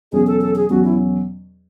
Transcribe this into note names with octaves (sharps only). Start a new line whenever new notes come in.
E2 B2 F#3 C#4 G#4
A4
A4
G#4
E2 B2 F#3 C#4 F#4
E4